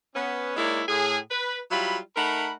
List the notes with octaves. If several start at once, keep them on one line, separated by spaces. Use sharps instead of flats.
B3 C#4
G#3 A#3 D#4 E4 C#5 D5
A2 G#4
B4
F#3 G3 E4 F4 B5
A3 D#4 A#4 F#5 B5